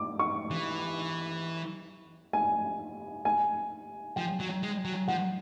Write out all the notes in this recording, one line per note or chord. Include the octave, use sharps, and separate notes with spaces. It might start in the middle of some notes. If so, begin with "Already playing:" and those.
Already playing: D6
C#6
E3
G#5
G#5
F3 G5
F#3
G#3
F#3
F3 F#5